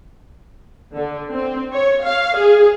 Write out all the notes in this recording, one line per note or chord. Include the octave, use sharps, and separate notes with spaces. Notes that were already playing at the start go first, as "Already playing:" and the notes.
D3
C4
C#5
F5
G#4